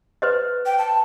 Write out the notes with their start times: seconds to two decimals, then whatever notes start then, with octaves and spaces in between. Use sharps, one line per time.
0.22 B4 C5 D#5
0.66 G5
0.78 A5